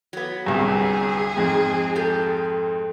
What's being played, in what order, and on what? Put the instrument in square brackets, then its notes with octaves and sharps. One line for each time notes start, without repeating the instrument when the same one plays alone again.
[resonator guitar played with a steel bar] F#3 B3
[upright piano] G1 C2 G2 [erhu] G#4
[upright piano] F2 G#2
[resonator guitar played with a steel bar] G4 A4